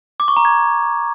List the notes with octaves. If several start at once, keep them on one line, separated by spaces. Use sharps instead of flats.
D6
C#6
A#5
G#6